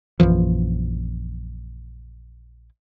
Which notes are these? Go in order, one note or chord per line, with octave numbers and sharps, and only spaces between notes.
A#1 F#2 E3 F3